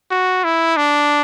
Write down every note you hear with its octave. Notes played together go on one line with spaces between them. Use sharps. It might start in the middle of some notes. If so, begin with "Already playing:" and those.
F#4
E4
D4